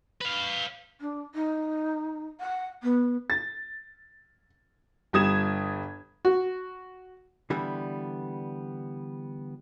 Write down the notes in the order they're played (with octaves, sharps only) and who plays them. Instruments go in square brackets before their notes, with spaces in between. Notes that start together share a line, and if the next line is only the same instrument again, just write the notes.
[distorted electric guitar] B4 F5
[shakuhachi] D4
D#4
F#5
B3
[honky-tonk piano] A6
G1 G3 D#6 G#6 E7
[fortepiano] F#4
[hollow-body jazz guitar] D3 E3 G3 B3